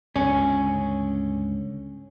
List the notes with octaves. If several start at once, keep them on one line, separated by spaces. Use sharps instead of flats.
C#2 G2 D3 C#4